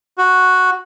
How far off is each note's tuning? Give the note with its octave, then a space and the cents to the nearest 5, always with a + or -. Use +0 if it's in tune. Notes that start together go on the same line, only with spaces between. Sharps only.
F#4 -5